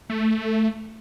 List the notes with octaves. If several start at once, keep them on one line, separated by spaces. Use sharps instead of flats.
A3